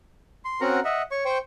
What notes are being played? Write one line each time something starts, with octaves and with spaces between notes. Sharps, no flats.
C6
C4 C#4 F#4 A#4 F#5 A#5
D#5 E5 F#5
C#5 C#6
C5 G5 C#6